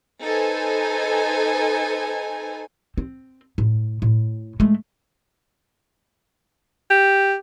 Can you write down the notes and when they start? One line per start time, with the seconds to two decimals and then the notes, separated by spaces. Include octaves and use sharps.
0.24 D#4 A4 B4 C5 G#5
2.97 C4
3.58 A2
4.02 A2
4.60 G#3 A3
6.90 G4